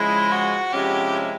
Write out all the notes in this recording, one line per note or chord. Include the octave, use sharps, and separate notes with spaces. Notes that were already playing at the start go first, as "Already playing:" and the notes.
Already playing: C#3 F3 G#3 E4
F#4
C3 F3 G#3 C#4 E4 G4